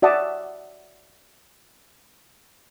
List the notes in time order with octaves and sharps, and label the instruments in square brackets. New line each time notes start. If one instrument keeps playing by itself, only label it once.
[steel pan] F#4 D5 E5 F#5 A5 D#6